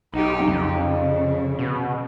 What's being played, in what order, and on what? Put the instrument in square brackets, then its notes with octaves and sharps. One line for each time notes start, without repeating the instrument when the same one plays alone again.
[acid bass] B1 [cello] D#4 G4
[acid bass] F2 [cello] C#3
[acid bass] B2